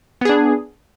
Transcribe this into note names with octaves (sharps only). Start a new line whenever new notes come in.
B3 D4 G#4